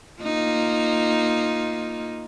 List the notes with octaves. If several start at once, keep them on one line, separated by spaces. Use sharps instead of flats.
A#3 D#4 F4